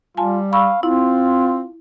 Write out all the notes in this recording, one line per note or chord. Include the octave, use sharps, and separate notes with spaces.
G3 F4 G#5 A5
F5 B5 C#6 E6
C4 E4 F4